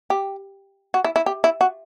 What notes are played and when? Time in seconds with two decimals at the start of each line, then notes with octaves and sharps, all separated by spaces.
0.10 G4
0.94 F#4
1.05 E4
1.16 E4
1.26 G4
1.44 E4
1.61 F#4